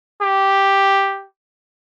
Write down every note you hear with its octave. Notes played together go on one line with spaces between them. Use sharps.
G4